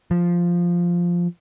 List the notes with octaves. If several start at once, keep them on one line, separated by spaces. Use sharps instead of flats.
F3